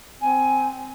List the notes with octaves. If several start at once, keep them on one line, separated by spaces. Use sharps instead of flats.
C4 G#5